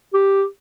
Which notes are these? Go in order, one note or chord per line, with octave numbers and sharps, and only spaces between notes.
G4